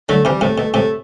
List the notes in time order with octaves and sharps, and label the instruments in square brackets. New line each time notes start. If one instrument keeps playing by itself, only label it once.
[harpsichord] D3 F#3 [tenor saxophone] A3
[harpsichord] C3 E3 [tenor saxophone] G3
[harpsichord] A2 C3 [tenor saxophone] A3
[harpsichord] B2 [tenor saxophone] A3
[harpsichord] A2 C3 [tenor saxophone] A3